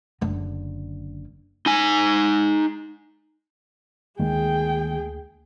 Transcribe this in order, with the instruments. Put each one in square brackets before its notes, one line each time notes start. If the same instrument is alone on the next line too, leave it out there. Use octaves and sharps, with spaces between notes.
[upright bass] F#1 D3
[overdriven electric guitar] D#4 G#5
[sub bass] D2 [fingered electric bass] D#3 G#3 A#3 [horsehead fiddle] G#4 G5